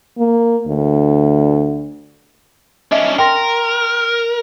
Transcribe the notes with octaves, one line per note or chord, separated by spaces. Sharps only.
A#3
D2
C#4 D4 D#5 E5
A#4 G5 C6 A#6